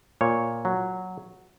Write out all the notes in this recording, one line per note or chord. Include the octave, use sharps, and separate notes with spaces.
A#2 C#5
F#3